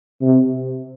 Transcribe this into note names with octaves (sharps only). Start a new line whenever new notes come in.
C3